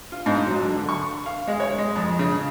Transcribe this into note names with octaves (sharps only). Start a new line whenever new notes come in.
F4
G#2
F#3
D3
D3
C#6
F5
G#3
C#5
G#3
F2
C#3